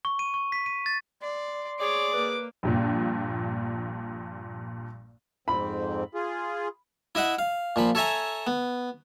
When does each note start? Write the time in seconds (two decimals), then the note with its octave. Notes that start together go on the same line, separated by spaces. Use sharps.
0.05 C#6
0.19 D#7
0.34 C#6
0.52 B6
0.66 D#7
0.86 A6
1.22 D5 C6
1.80 G#4 C#5 D5 D6
2.13 A#3 B4
2.63 A#1 G2 A#2
5.48 F2 G#2 C4 B5
6.15 F4 G#4
7.15 E4 D#5 E5 F#5
7.39 F5
7.76 A#2 F3 B5
7.95 A4 C#5 E5 G#5 A#5
8.47 B3